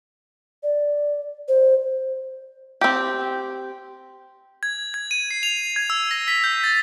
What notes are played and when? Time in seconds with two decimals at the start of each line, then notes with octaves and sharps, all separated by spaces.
0.63 D5
1.48 C5
2.81 C4 G4
4.63 G#6
4.94 G#6
5.11 D#7
5.31 C7
5.43 F7
5.76 G#6
5.90 E6
6.11 A#6
6.28 B6
6.44 G6
6.64 A6